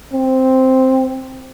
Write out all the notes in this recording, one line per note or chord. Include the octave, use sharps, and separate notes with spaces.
C4